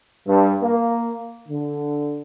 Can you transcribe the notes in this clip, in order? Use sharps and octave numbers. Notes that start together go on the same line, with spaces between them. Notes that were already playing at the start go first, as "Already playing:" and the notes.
G2
A#3
D3